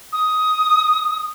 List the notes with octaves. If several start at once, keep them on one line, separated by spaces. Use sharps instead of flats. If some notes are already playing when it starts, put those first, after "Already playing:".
D#6